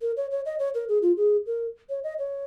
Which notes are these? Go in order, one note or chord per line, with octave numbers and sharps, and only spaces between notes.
A#4
C#5
C#5
D#5
C#5
A#4
G#4
F4
G#4
A#4
C#5
D#5
C#5